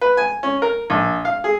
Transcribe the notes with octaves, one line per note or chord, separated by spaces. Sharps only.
B4
G#5
C#4
A#4
A#1
F5
G#4